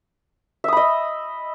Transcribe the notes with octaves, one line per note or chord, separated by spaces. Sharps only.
D#5 E5 B5 D#6